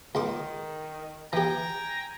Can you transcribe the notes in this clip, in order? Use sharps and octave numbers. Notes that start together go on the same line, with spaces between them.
C#2 D#3 C6 D6
E3 G4 G5 G#5 A#5